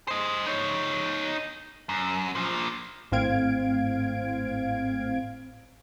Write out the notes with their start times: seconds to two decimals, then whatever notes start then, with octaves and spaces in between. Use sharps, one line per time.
0.08 C5 D#5
0.47 D#4 C#5
1.89 F#2
2.35 A#2 F3
3.12 G#1 A2 C4 F5 G#6 D7